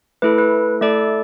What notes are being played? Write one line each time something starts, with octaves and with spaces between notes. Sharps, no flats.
A3 E4 A4 B4
B4
A3 E4 A4 D5